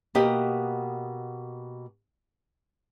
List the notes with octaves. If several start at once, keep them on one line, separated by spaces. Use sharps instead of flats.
B2 A#3 G4 D#5 F#5